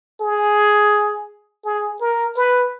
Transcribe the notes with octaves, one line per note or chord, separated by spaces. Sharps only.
G#4
G#4
A#4
B4